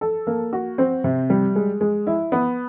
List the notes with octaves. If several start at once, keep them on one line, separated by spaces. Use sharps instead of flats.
A4
A#3
F#4
C4
C3
G3
G#3
G#3
E4
B3